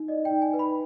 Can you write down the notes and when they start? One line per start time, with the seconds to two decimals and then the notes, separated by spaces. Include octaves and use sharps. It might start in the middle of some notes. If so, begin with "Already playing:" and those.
Already playing: D#4
0.08 D5 D#5
0.25 G5
0.31 D#4
0.42 G#5
0.53 B4
0.59 B5